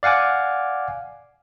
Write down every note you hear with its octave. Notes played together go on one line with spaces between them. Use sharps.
D5 F5 F#5 G#5 D6